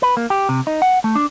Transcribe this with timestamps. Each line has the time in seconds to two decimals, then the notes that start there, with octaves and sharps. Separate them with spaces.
0.02 B4
0.17 A#3
0.30 G4
0.49 C3
0.67 D#4
0.82 F#5
1.04 A3
1.15 D4